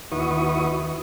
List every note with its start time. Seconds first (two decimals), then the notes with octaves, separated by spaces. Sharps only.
0.12 D#2 E4 F#4 B4 C#6 D#6